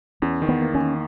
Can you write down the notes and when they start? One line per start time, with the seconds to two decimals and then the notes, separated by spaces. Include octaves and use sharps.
0.22 E2 C#4
0.42 D#3
0.49 B3
0.62 A#3
0.75 C#4
0.81 D#3